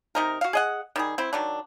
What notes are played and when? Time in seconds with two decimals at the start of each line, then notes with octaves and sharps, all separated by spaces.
0.15 C3 D#4 A#4
0.41 F#4 F5
0.53 G#4 D#5 F#5
0.96 D#3 G3 G#4
1.18 C4 E4
1.33 D#3 F#3 D4